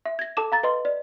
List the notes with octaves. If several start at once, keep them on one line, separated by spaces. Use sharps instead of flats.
E5
G#6 A#6
A4 A5 D6 E7
F5 A#5 A6
B4 D#5 C6
D5